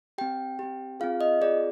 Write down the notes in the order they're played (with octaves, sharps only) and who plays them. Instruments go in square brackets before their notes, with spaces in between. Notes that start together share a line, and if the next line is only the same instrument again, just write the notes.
[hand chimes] C4 G4 G5
C4 G4
C4 F4 G#4 F5
D#5
C4 F4 G#4 D5